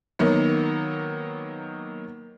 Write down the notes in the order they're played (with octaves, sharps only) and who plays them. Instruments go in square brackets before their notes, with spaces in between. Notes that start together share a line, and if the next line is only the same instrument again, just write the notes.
[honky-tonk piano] D#3 F#3 A#3 B3